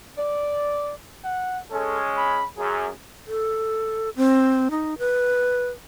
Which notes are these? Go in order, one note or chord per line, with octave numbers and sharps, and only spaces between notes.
D5
F#5
G#3 C#4 A4
B5
F#2 G#4
A4
C4
D#4
B4